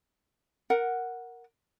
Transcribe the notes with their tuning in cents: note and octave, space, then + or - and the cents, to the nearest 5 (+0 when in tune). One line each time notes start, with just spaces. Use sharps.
A#4 +0 F#5 +0